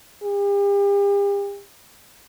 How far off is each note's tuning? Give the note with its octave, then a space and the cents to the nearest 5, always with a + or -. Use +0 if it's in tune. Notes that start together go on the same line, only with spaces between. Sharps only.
G4 +40